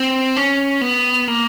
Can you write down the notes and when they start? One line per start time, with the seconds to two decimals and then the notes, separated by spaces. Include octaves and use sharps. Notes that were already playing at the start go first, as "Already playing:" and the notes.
Already playing: C4
0.36 C#4
0.81 B3
1.28 A#3